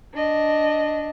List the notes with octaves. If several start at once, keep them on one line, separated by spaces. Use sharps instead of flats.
D4 D#5